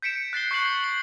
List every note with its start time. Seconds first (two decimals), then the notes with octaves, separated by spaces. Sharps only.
0.02 G6 B6 C#7 D7 E7
0.33 F#6 A6 C7 G7
0.51 C#6 F#6 G6 C7 F#7
0.84 F#7